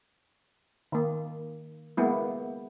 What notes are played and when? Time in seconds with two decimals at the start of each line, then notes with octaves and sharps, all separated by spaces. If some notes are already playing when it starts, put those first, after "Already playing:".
0.92 D#3 A#3
1.97 G#3 A#3 B3 E4